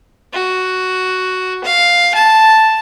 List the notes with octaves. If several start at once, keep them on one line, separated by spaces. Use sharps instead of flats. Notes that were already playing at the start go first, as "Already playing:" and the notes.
F#4
F5
A5